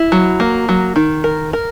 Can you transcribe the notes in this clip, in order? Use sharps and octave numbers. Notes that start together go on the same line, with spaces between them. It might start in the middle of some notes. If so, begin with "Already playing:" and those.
Already playing: E4
F#3
A#3
F#3
D#3
A#4
A#4